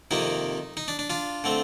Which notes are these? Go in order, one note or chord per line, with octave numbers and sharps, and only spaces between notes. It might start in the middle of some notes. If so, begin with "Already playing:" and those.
F2 C3 D#3 A#3 D#4
D#4
D4
D4
D4 F4
D3 A3 C4